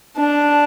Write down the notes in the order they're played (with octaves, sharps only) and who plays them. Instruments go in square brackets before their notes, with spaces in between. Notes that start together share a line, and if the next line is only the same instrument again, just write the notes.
[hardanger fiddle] D4